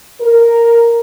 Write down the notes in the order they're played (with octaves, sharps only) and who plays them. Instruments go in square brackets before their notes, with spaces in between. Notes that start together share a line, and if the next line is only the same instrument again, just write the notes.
[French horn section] A#4